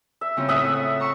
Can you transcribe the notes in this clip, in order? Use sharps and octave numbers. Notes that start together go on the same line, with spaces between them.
E5
C#3 C4 F4
A2 E5 F#5 D#6
A#5 C#6 E6